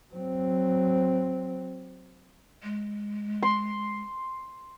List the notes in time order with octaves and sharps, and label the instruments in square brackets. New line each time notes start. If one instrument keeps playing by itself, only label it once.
[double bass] F#3 C4
[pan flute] G#3
[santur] C6